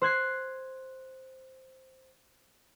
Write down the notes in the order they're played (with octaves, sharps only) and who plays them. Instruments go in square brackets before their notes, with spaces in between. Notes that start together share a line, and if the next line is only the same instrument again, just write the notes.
[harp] C5 F#6 G#6 C7